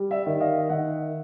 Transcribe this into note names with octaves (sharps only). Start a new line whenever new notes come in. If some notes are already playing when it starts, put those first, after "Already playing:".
Already playing: G3
D5 E5
D#3
D#5 F5
D#3 E5 F#5